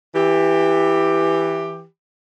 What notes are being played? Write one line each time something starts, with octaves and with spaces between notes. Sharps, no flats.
E3 G4